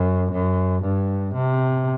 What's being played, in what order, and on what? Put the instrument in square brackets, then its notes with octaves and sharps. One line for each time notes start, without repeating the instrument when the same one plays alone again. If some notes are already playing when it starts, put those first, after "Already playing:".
Already playing: [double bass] F#2
F#2
G2
C3